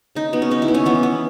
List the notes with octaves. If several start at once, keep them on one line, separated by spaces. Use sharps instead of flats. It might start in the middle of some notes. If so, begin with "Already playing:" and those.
C#3 D#4
F#3 B3
C#4
C#3 D#4
E4
B3
C#4
E3 B3
B3